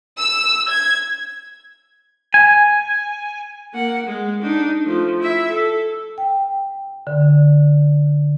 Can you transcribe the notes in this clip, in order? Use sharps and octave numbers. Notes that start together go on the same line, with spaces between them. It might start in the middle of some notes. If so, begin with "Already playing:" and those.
E6
G#6
G#5
A#3 F#5
G#3
D4 D#4
F3 A3
E4 E5
A4
G5
D3